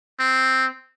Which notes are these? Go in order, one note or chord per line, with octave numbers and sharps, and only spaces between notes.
C4